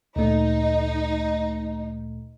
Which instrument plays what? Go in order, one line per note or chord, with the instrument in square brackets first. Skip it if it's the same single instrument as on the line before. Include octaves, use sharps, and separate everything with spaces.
[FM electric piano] D2 A#2 A3 [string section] D#4